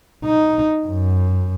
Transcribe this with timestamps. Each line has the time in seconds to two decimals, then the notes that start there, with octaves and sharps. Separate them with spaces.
0.25 D#4
0.87 F#2